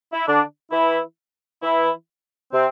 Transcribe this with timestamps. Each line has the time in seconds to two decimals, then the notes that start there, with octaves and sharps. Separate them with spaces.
0.13 E4
0.27 D3 D4
0.72 E3 E4
1.63 E3 E4
2.53 C3 C4